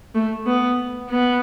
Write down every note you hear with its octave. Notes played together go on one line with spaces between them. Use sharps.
A3
B3
B3